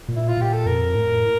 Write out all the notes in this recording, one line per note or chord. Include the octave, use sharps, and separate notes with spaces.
A#2
E4
F4
A#2 G4
A4
F2 A#4
A2